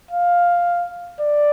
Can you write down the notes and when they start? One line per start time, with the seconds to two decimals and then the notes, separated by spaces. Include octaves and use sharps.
0.11 F5
1.21 D5